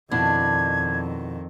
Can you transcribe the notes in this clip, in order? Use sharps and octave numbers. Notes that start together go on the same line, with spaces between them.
F2 B2 D#3 D4 E4 G#6